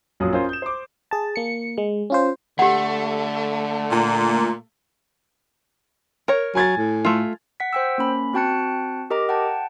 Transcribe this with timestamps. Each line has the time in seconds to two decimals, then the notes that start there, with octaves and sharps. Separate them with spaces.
0.20 A#1 F#2 F#3 F4 D#6
0.33 C#4 F4 A#4 C5
0.49 G6 E7
0.62 C5 D6
1.11 G#4 A5
1.36 A#3 C#7
1.78 G#3
2.10 C#4 F4 C5
2.59 D3 A3 G4 F#5
3.90 A#2
6.28 A#4 C#5
6.55 F#3 G#5 G#6 A6
6.77 A2
7.05 A3 F4
7.60 F#5 B6
7.73 C5 G5 E6
7.98 A#3 C#4 B5
8.33 C4 F#4 G5 A5 F#6 C#7
9.10 G4 A#4 D#5 A#5 D6
9.29 F#5 G5 A5